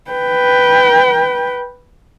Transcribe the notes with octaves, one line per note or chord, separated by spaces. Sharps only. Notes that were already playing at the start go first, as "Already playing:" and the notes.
B4 G5